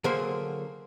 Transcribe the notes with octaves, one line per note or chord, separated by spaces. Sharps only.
D3 F#3 A#3 G#4 C5